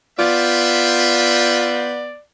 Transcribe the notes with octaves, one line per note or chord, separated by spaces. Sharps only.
B3 F4 C5 D5 E5 G5